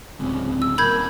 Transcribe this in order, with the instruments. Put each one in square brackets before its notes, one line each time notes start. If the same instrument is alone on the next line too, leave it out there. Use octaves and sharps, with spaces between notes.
[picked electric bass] D1 C#2 [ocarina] C4
[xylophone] E6
[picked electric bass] D#1 A#3 [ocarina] A#4 [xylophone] B5 G6 G#6